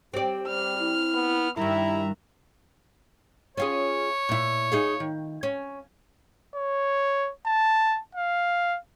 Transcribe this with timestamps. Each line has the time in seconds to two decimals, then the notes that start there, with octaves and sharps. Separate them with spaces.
0.14 C4 G4 D5
0.48 G3 F6
0.79 E4
1.14 B3
1.57 G2 D#3 G3 E4 E5 A#5
3.57 C#4 F4 G#4 C#5
4.29 A#2 E4
4.72 D#4 G#4 F5
5.00 D#3
5.43 C#4
6.55 C#5
7.46 A5
8.15 F5